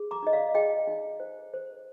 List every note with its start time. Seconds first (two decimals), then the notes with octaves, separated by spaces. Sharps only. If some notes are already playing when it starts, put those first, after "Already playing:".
Already playing: G#4
0.11 A#5 D6
0.23 D#4 D#5
0.33 D5 F5
0.55 G#4 D#5 G5
0.88 D#4
1.20 C5
1.54 C5